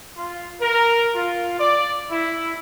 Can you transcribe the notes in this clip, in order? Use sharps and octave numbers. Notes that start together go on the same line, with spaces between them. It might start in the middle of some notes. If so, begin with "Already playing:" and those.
F4
A#4
F4
D5
E4